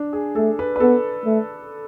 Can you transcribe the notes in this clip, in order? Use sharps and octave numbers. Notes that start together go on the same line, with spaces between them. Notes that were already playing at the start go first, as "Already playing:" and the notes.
Already playing: D4
G#4
A3 A4
B4
B4
B3 A4
A3